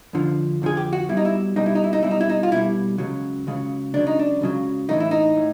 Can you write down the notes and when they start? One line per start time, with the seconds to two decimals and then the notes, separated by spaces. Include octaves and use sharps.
0.13 F2 D3 F3
0.62 F2 D3 F3 G#4
0.77 G4
0.93 F#4
1.09 B1 B2 G3 E4
1.17 D#4
1.25 E4
1.56 B1 B2 G3 D#4
1.66 E4
1.75 D#4
1.84 E4
1.93 D#4
2.03 B1 B2 G3 E4
2.11 D#4
2.21 E4
2.29 D#4
2.43 F4
2.51 B1 B2 G3 E4
2.98 C#2 C#3 F#3
3.47 C#2 C#3 F#3
3.94 C#2 C#3 F#3 D4
4.07 D#4
4.19 D4
4.41 C#2 C#3 F#3
4.89 A2 E3 A3 D#4
5.00 E4
5.11 D#4
5.37 A2